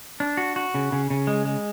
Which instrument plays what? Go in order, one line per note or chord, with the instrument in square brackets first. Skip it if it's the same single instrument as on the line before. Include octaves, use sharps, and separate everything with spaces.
[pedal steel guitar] D4
F#4
F#4
C#3
C#3
C#3
G#3
G#3